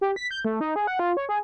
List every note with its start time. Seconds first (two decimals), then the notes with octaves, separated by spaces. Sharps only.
0.01 G4
0.16 B6
0.31 G6
0.45 A3
0.61 D#4
0.76 G#4
0.87 F#5
0.99 F4
1.17 C#5
1.29 G#4